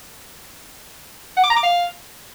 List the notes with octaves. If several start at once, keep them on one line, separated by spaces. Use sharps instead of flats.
F#5
D6
A#5
D6
F5